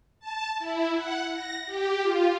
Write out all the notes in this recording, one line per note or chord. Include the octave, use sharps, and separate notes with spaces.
A5
E4
F#5
A#6
G4
F4